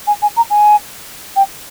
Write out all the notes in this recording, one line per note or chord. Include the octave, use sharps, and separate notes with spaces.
G#5
G#5
A#5
G#5
G5